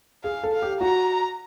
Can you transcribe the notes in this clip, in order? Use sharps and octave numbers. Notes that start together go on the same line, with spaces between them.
G#4 F5
A4
F5
G4
F#4 A#5